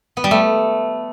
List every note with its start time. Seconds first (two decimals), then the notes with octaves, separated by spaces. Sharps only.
0.17 B3
0.24 G3
0.31 A3